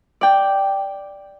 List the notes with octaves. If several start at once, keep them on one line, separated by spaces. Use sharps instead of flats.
D5 G5